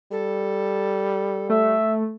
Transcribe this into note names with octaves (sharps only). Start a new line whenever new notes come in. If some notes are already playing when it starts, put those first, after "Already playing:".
G3 A4
A3 E5